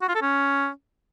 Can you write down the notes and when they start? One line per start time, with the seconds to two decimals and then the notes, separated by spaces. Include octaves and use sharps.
0.02 F#4
0.08 F4
0.15 A4
0.22 C#4